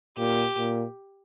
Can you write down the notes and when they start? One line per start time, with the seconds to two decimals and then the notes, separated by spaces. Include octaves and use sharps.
0.18 A#2 G4
0.57 A#2